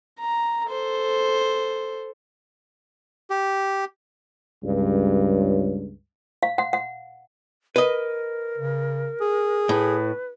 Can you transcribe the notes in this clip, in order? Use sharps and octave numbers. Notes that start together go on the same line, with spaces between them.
A#5
A4 C5
G4
C#2 G2
F5
F#5
F#5
A#4 B4 D#5
C#3
G#4
A2 B4